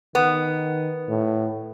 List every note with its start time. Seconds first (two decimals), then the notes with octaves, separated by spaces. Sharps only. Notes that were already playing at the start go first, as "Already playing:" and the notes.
0.15 D#3 B3
1.09 A2